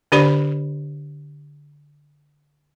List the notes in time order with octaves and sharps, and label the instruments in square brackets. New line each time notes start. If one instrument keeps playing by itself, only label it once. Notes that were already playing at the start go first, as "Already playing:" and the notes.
[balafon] D3 D4 G4 C5 D5 B5